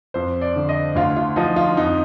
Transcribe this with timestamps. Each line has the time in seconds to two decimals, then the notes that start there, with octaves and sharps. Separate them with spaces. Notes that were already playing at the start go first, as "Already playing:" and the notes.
0.14 F2 C5
0.41 D5
0.56 D3
0.69 D#5
0.95 D2 F4
1.17 F4
1.36 F3 D#4
1.56 F4
1.77 F2 D#4